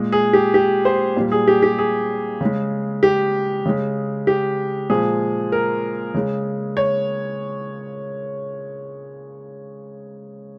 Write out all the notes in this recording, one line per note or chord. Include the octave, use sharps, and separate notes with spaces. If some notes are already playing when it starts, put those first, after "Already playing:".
Already playing: A#2 G#3
G#4
G4
G4
C5
A#2 G3
G#4
G4
G4
G#4
C#3 G#3
G4
C#3 G#3
G4
A#2 F3 G#3 G#4
A#4
C#3 G#3
C#5